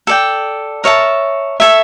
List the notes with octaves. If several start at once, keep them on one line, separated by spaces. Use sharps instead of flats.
A4 D5 G5
A#4 C#5 E5 A5
A4 C#5 E5